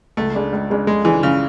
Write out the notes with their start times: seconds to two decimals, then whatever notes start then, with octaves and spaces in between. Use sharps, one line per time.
0.17 C#2 A3
0.35 C#3 G#3 D4
0.53 C#2
0.70 C#3 G#3 D4
0.87 C#2 G#3
1.05 C#3 E3 G#3 D4
1.23 C#2 C#3